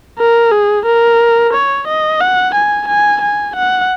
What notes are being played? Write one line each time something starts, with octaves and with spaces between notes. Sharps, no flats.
A#4
G#4
A#4
C#5
D#5
F#5
G#5
G#5
G#5
F#5